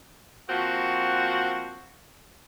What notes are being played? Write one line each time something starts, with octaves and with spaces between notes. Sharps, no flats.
F3 A#3 C4 F#4